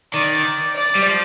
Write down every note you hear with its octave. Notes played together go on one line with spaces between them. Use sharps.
D#3 D5
D5
G3
F3